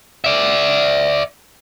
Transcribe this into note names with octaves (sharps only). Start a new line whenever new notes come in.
D5 E5